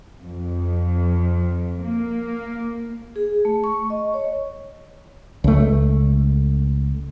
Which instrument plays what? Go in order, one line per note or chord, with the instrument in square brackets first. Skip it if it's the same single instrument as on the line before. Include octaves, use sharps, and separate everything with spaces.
[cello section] F2
A#3
[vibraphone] G#4
A3
C#6
D#5
C#5
[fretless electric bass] C#2 A3